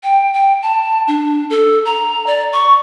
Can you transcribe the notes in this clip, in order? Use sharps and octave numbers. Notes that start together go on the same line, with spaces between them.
G5
G5
A5
D4
A4
A#5
D5
C#6